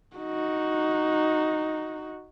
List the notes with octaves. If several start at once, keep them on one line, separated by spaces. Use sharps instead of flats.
D#4 F#4